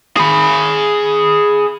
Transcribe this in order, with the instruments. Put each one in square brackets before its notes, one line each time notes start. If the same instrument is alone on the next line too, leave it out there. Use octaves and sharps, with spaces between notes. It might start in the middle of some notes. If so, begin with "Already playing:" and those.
[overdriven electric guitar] G#4 B5